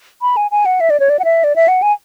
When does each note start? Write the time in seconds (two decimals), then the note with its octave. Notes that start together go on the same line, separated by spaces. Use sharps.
0.22 B5
0.37 G#5
0.51 G#5
0.66 F#5
0.80 E5
0.90 D5
1.00 C#5
1.09 D5
1.19 F#5
1.24 E5
1.44 D5
1.56 E5
1.68 F#5
1.82 G#5